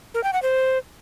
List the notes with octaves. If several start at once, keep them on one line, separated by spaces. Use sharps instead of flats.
A#4
G5
F#5
C5